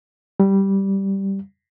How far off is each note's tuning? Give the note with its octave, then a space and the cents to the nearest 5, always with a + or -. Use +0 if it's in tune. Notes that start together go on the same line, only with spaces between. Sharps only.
G3 -5